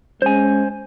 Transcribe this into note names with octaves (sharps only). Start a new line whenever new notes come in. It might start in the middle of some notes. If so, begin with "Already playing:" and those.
G#3 C#4 C5 G#5